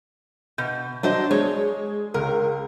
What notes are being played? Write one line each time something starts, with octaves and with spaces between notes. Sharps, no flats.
B2 G6
F#3 D4 C5 D#5
G#3 C#5
C#2 A#4